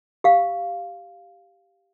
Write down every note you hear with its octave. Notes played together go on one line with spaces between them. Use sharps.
G4 F5